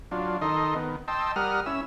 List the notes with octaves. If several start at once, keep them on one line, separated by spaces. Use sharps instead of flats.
F#3 D4 F4
D#3 D#4 A4 D#5 C6
D#3 B3
D#5 G5 A5 C6 E6
G3 A#4 F#5 D#6 F6
C#4 E4 E6